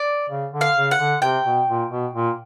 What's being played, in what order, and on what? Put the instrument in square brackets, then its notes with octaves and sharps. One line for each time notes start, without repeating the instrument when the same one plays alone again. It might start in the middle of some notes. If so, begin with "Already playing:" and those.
Already playing: [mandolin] D5
[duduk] C#3
D3
[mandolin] F5
[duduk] C#3
[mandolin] F#5
[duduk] D3
[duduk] C3 [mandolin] G5
[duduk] B2
A#2
B2
A#2